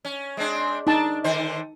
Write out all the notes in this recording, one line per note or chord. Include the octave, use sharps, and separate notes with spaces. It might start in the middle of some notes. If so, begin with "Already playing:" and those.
C#4
G#3 C4 D4
D4 D#4 A5
D3 D#3 C5